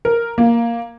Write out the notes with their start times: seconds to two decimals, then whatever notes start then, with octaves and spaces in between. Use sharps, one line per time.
0.05 A#4
0.38 A#3